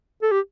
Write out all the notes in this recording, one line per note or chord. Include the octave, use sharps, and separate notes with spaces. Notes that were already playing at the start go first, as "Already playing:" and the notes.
A4
G4